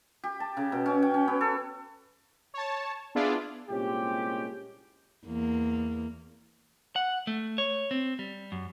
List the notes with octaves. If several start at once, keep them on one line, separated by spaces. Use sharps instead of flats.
G4
A5
C#3
B2
C#4
G5
C#4
B3
A4
C#5 A5
B3 D4 E4 F4 G#4 D5
C2 A#2 G#3 C4 C#4 G4
E2 A#3
F#5
A3
C#5
C4
G3
F#2